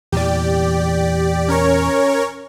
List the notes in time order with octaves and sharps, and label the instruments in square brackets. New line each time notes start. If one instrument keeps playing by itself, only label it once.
[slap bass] E2 A#2 E3 [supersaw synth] G4 D5
[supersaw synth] C#4 A#4 C#5